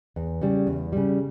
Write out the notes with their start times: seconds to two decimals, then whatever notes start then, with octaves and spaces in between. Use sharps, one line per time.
0.16 E2
0.41 C#3 G3
0.67 E2
0.93 C#3 G3